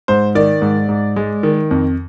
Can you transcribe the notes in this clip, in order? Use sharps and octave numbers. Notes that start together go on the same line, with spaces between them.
G#2 C5
D#3 D5
G#2
G#2
G#3
D#3
F2